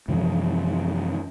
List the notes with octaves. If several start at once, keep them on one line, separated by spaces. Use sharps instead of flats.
F#2 C3 E3 F3